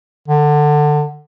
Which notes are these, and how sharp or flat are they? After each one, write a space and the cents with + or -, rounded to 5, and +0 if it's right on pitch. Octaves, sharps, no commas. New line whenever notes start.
D3 +20